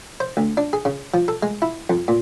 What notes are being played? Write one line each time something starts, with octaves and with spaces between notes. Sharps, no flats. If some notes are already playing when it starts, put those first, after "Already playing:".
C5
D2
D4
G#4
C#3
F3
A4
G#3
E4
F2
A#2